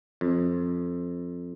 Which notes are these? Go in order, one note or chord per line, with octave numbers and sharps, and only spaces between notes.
F2